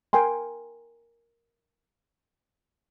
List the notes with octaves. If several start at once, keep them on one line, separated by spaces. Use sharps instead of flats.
A#4 G5 G#5 C6